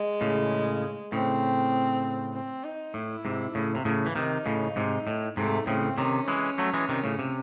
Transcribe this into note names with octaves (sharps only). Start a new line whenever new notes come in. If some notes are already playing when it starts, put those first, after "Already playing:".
Already playing: G#3
A2 C#3
A2 C#3 C4
C4
D#4
A2 E4
G#2 C3
A2 C#3
C3
A2 C#3
E3
C3 D#3 D#4
A2 C#3
G#2 C3
A2
G#2 C3 A3
A2 C#3 C4
C3 D#3 C#4
E3 G#3
F#3 A3
E3 G#3
C3 D#3
A2 C#3
C3